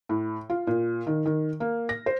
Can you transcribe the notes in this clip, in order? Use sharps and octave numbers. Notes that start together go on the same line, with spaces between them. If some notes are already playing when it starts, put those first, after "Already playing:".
A2
F4
A#2
D#3
D#3
A#3
A#6
C5